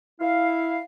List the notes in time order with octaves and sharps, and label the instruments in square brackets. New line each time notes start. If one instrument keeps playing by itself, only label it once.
[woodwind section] E4 F5